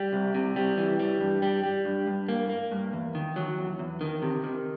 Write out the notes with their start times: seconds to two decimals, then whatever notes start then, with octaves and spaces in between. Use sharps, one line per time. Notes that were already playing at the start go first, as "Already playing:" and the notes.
Already playing: G3
0.13 C2
0.34 C3
0.56 G3
0.78 E3
0.99 G3
1.20 G2
1.42 G3
1.64 G3
1.85 G2
2.07 G2
2.28 A#3
2.49 A#3
2.71 G2
2.93 E2
3.15 D#3
3.36 F#3
3.58 E2
3.79 E2
4.01 D#3
4.22 C3
4.44 D#3